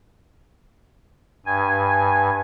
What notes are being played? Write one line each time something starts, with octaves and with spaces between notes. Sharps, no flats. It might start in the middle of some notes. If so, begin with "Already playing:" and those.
G2 G#5